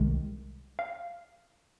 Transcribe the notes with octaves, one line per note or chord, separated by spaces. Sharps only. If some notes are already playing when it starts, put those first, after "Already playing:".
Already playing: C2 C3 D#3 G#3
F5